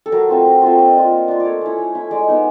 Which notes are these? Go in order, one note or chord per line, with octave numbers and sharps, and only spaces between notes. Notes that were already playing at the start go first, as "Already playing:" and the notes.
A4
F#3 A#4
A3 C4 F4
F#3
A3 C4 F4
A#3 D#5
D4 F4
A#3
D4 F4
A3 C#5 D5
C#4 E4
A3
C#4 E4
G#3 D5
B3 D#4